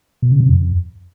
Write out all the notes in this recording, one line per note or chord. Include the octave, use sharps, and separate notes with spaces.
B2
C#3
C3
F2